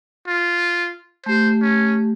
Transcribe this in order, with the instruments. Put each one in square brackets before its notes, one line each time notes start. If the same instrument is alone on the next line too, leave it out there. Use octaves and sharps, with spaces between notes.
[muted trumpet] F4
[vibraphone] A3 G4 [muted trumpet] C5
[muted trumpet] C#4